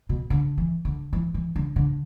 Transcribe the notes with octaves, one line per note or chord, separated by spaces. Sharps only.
B2
D3
E3
D3
E3
E3
D3
D3